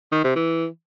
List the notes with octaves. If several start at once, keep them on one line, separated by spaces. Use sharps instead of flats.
D#3
C3
E3